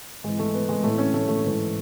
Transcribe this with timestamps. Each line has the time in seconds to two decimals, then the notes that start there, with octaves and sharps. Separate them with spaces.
0.24 G#2 E3 G#3
0.39 A3
0.54 B3
0.69 G#3
0.83 A2 E3 A3
0.98 C#4
1.14 A3
1.28 A3
1.43 G#2 E3